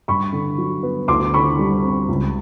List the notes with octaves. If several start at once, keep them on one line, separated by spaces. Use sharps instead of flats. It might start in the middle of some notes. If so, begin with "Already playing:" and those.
G2 B5 C#6
D3
F#3
B3
D2 C6 D6
D3 B5 C#6
G3
C4
C#2